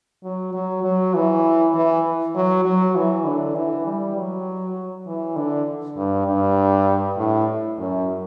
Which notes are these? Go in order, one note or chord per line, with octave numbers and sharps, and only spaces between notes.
F#3
F#3
F#3
E3
E3
F#3
F#3
E3
D3
E3
G3
F#3
E3
D3
G2
G2
A2
F#2